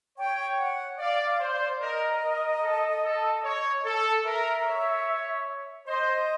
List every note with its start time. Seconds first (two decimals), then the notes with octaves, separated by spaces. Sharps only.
0.19 C#5 G5
0.59 F#5
0.99 D5 F5
1.26 F5
1.40 C5
1.53 D5
1.80 A#4 D#5
2.22 A#4
2.62 A4
3.03 A4
3.44 C#5
3.85 A4
4.25 A#4 E5
4.65 C#5
5.87 C5 D#5